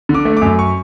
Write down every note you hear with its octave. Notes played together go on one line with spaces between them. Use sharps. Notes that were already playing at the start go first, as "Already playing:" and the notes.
D3
D6
A3
D6
F#2
C#6